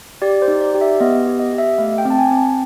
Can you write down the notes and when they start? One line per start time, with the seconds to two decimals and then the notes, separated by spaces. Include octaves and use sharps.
0.22 G4 D5
0.42 C5
0.48 D#4
0.61 D5
0.74 G4
0.81 E5
1.00 B3 D#5
1.26 G4
1.39 D#5
1.53 G4
1.58 E5
1.78 A3 F5
1.98 G5
2.05 C4
2.10 A5
2.18 G#5
2.31 C4
2.37 A5